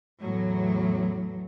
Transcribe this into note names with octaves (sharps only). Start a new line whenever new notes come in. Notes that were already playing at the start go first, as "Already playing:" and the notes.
E2 A2 F#3